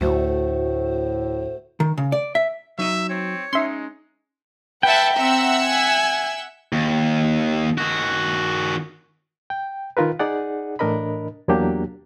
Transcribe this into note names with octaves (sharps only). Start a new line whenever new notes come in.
D2 A2 A3 F#4 C5
D#3
C#3
D5
E5
F#3 D#4 D#5 E5
C4 C#5
G#3 C#4 D#4 E5 C6
B4 E5 F#5 G5 A5
C4 E5 F#5 A#5 E6
G#5
D#2
D#3 F#4
G5
D#3 D#4 F4 A#4 B4
D#4 G#4 D5 F#5
A2 E3 D4 A#4 D#5 B5
E2 F#3 A#3 D4 G4